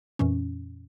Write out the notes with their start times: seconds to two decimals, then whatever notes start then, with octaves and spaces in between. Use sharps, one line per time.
0.19 F2 A#2 E3 C#4